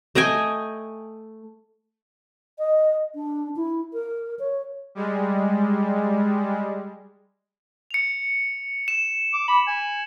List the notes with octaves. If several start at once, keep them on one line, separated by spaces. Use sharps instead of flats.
A3 D#5 G5 G#5
D#5
D4
E4
A#4
C#5
G3 G#3
C#7 F7
E7
D6
B5 F#7
G#5